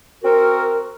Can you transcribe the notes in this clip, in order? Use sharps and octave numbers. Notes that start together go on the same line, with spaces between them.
C4 F#4 A#4